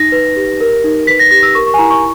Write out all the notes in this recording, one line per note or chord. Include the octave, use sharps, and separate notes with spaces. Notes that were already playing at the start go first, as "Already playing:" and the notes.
Already playing: D#4 A#6
B4
G4
A#4
D#4
B4 B6
A#6
G4 A#6
E6
A#4 C#6
C#6
G#5
E4 A#5
C#6